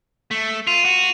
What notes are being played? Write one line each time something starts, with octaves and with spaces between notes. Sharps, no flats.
A3
F4 D#7 F7
F#4